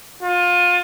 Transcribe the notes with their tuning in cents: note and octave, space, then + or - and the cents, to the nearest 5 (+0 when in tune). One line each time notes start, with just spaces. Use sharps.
F4 +25